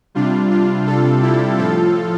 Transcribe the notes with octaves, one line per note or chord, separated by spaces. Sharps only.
C3 G3 D4 F4
D4 F4
F4 A4
E4 G4
A2 F3 F4 A4